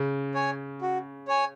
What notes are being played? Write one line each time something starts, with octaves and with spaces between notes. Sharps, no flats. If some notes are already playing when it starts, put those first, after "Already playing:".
Already playing: C#3
C#5 G#5
F#4
C#5 G#5